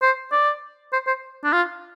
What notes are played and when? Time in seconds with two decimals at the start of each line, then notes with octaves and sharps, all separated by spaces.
0.02 C5
0.32 D5
0.93 C5
1.07 C5
1.44 D4
1.53 F4